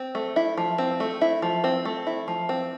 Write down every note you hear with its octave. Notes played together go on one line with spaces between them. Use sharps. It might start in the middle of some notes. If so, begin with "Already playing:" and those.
Already playing: C4
A3
E4
F3
C4
A3
E4
F3
C4
A3
E4
F3
C4